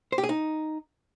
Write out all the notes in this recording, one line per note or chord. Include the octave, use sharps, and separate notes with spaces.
C5
G4
G#4
D#4